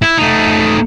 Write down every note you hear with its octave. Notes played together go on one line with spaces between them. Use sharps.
E4
A3 D#4